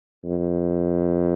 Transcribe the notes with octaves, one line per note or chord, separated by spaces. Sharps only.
F2